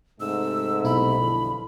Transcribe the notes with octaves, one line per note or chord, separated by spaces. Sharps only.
G#2 C3 A3 E6
B1 E4 B5
G2 D3 F3